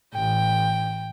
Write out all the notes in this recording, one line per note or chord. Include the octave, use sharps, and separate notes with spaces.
A1 G5